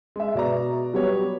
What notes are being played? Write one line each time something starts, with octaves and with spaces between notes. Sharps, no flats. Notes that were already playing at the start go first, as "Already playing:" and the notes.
G#3 E5
B2 D5 A#5
F#3 G3 B3 G4 C#5